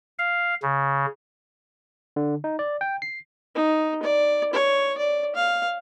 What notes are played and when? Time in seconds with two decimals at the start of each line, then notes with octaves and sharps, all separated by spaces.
0.19 F5
0.63 C#3
2.16 D3
2.44 D#4
2.59 D5
2.81 G5
3.02 C7
3.55 D#4
4.03 D5
4.53 C#5
4.98 D5
5.35 F5